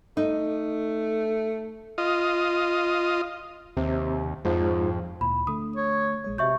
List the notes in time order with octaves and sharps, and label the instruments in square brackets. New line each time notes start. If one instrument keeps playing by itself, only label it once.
[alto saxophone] A3 [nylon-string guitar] D#4
[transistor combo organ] F4 D#5
[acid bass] D#2 [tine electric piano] C3
[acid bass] F2 [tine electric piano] G#2 F3
[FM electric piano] D2 A#2 E4 [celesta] B5
[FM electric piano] D3 A3 [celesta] D#6
[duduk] C#5
[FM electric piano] A#1 G#3 C#5
[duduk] C3 [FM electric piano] F#4 C#5 D#5 [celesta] E5 C#6 G6